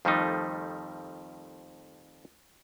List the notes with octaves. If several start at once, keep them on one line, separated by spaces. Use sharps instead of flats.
F2 D#3 F3 G3 A3 D#4